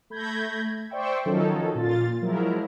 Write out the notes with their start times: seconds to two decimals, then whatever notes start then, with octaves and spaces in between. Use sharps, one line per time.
0.10 A3 B5 G6 G#6 A#6
0.90 C5 D5 E5 G5 C#6 E6
1.26 D#3 F3 F#3 C#4 D#4 A4
1.75 A#2 F4 A6
2.21 F3 F#3 G#3 E4 A#4